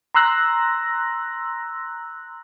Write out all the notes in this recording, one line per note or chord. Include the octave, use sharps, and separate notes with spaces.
A#5 C6 E6 F#6 A#6